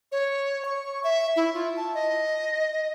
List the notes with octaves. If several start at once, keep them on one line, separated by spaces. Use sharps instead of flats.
C#5
C#6
E5
E4
F4
A5
D#5